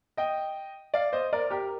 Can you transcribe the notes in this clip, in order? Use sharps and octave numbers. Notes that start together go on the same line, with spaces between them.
D#5 G5
D5 F5
C5 D#5
A#4 D5
G4 A#4